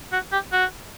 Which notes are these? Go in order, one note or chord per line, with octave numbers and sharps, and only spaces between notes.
F#4
G4
F#4